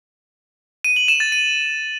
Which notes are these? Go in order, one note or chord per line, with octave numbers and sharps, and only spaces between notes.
D#7
F#7
E7
A6
D#7